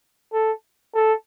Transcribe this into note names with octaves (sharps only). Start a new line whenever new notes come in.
A4
A4